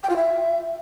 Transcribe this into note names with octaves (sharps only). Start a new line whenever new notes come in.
G5
F4
E5